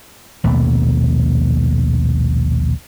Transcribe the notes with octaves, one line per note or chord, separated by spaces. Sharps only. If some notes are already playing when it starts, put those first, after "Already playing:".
A#1 D#2 B2 A3